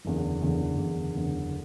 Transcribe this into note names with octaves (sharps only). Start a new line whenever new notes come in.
F#1 E2 D3
F#1 E2 D3
F#1 E2 D3
F#1 E2 D3